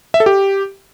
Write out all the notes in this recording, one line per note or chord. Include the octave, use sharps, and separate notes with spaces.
E5
A4
G4